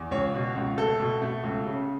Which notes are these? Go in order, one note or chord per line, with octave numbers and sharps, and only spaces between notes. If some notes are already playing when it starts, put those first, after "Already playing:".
Already playing: E2
C#2 C#5
B2
C#2
A3 A4
B2
A3
C#2
C#3